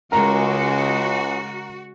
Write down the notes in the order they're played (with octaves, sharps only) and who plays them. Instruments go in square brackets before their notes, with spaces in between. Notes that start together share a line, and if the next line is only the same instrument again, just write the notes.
[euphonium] C#2 [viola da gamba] C#3 G#3 [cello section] F#4 [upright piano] A#4 A#5